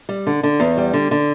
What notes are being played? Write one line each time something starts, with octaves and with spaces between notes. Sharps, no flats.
G3
D3
D3
E2
G3
D3
D3